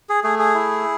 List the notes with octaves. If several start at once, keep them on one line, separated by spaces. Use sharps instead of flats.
G#4
A3 G#4
G#4
E4